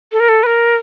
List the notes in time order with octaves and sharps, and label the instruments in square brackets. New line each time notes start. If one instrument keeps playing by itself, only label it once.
[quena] A4
A#4
A4
B4
A#4